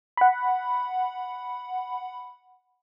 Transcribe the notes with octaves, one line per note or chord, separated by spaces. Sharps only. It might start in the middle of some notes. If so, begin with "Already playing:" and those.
F#5 B5